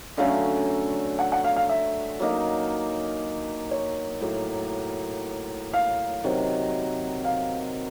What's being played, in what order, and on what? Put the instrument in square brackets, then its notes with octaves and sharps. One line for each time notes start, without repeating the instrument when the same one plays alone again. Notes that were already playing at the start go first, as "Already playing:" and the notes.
[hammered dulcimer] D3 F#3 A3 C#4 [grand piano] F5
[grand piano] F#5
F#5
F5
F5
E5
[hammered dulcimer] F#3 A#3 D#4
[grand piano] C#5
[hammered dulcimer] A2 F#3 A#3
[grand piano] F5
[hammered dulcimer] C3 D#3 F#3
[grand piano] F5